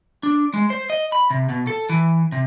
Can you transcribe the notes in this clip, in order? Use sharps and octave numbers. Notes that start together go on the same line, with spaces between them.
D4
G#3
C5
D#5
B5
C3
B2
A4
E3
C3